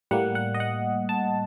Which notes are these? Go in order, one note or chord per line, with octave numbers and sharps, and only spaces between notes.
A2 G3 A#3 F#5
F#5
D#5
F#5
A5